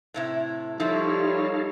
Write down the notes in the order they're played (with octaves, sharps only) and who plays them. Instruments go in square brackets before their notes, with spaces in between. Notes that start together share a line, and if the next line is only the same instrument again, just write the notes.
[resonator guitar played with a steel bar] A2 C3 E4
[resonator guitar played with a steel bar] F3 E4 [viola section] G3 C#5 [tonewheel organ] D#4 A4 F5